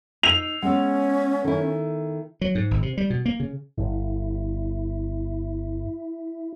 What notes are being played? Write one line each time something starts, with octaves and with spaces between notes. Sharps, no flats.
D#4 E6 G6 C7 F7
G#3 B3 C#4 F#5 E6
D#3 E4 A4
F#3
G#2
G#1
C3
G3
B2
A#3
C#3
G1 E4